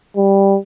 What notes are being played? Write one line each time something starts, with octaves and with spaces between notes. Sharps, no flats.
G3